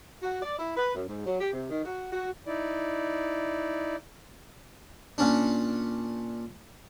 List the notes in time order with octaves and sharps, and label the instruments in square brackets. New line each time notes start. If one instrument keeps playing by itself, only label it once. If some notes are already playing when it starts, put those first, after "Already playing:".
[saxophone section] F#4
D5
E4
B4
F#2
G#2
F#3
G4
C3
D#3
F#4
F#4
[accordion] D#4 E4 D5
[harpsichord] A#2 C#4 D4